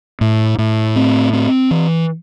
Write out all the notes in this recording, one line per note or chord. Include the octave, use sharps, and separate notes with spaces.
A2
A2
C4
C4
E3